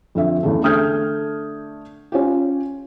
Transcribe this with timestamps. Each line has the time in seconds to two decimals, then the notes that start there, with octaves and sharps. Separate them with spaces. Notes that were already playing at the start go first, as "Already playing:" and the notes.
0.15 F2 D3 E5
0.43 E2 C#3 A3
0.63 D3 A3 D#6 F6 G6 G#6
2.12 C#4 F4 G4